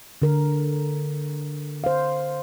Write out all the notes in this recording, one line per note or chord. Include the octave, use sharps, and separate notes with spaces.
D3 A#4
C5 F5